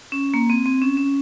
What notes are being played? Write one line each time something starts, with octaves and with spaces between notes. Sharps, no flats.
C#4
A#3
C4
C4
C#4
C#4